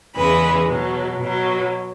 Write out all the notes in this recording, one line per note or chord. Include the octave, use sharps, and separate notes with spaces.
E2 C#3 E3 G#3 B4
B2 F#3
B2 F#3